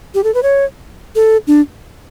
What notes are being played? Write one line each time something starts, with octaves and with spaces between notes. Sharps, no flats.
G4
A4
B4
C#5
A4
D4